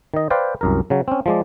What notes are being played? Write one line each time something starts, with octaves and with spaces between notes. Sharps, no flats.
D#3 D#5
B4 C5 D5 F5 G5
C2 F#2 A#4
C#3 F#3
C4 C#4
F3 G#3 D5